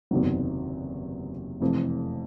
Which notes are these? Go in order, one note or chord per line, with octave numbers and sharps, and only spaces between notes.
F#1 E2 C3 D#3 F#3
F1 F2 C3 E3